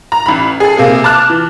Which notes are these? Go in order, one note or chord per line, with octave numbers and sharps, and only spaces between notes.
A#5
A1 B5
G#4 A4
C3 A#3 G#4
A5 D6 F6 F#6
E3